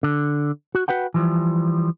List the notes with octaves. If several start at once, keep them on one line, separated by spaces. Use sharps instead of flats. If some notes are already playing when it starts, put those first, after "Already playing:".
D3
F#4
F#4 B4 F#5 G5
E3 F3 G3